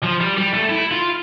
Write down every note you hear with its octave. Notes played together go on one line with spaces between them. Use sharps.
F3
G3
G3
A3
E4
F4